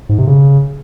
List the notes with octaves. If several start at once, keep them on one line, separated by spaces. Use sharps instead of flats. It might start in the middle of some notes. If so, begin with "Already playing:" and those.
G#2
C3
C#3